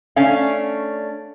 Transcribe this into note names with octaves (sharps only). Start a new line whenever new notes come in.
A3 C#4 D4 C#5 F5